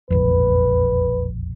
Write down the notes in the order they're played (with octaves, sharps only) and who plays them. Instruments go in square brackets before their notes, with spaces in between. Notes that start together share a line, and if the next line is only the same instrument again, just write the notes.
[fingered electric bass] E1 A#1 F2 [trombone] B4